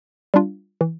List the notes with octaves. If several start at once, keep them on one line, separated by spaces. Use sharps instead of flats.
G3 D4 F4
E3